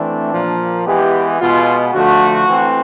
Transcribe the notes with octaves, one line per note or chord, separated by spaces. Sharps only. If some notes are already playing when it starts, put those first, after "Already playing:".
Already playing: E3 A3 C4 D4
A#2 F3 A#3
E3 G#3 B3 G4
B2 G#3 B3 F4
D3 F3 A3 F#4
E3 A3 C4